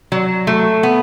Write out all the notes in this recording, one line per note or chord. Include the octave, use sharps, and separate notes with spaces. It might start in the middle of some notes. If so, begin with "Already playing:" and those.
F#3
A3
B3